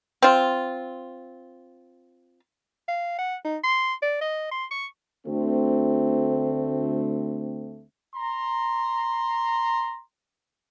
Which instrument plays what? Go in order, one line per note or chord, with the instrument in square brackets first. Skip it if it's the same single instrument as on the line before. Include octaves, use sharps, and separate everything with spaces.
[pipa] C4 F4
[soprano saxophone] F5
F#5
D#4
C6
D5
D#5
C6
C#6
[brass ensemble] D2 A3 C4
[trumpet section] A#5 C6